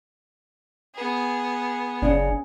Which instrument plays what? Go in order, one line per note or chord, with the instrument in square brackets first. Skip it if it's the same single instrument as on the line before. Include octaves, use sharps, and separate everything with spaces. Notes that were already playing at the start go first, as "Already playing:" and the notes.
[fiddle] B3 G#4
[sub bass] F#1 [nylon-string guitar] C#3 D4